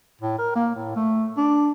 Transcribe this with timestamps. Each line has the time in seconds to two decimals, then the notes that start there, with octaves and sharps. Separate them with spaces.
0.21 A2
0.39 A#4
0.56 A#3
0.75 A2
0.96 A3
1.38 D4